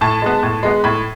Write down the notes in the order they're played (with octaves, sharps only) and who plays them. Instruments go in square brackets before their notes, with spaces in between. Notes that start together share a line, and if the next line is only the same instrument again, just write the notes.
[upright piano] A2 A5
G#3 B3
A2
G#3 B3
A2 B5